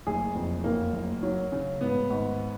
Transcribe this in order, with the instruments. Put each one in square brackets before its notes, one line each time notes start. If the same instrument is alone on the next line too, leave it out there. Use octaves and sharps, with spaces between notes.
[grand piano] F#1 G#4
F2
F#2 A#3
F#1
F#3
C#3
G#2 B3
G#1